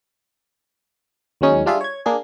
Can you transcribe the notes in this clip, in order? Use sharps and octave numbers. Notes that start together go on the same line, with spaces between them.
D#2 F#3 G#3 C#4 D#4
G3 D4 F4 G#4 E5
C#5 G#6
A#3 D4 G#4